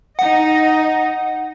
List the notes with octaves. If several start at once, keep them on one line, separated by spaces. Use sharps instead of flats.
D#4 D#5 F#5